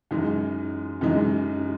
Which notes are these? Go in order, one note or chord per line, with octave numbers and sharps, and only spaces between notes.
F#2 E3 G#3 D#4
F#2 E3 G#3 D#4